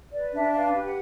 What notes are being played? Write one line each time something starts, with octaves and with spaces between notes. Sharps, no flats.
B4 D5
D4 E5
B4 F5
G4
F#5